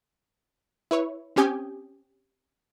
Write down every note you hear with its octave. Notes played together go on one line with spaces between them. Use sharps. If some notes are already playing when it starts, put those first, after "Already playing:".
E4 B4 C#5
C4 C#4 G4 G#5 D#6 G6